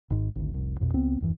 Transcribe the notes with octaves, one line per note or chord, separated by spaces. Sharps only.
G#1 G#2
G#1 D2
F1 C2
A#1 F2 B2
C#2 B3 C4
D#1 F#2 E3